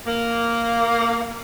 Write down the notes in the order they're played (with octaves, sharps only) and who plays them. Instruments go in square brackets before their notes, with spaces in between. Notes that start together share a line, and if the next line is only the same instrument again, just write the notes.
[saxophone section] A#3